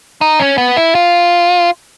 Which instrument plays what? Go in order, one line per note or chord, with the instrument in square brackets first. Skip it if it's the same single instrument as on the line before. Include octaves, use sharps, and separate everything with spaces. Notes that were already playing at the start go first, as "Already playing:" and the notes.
[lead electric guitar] D#4
C#4
B3
E4
F4